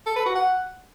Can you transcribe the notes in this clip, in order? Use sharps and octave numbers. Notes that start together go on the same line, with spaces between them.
A4
B4
F#4
F#5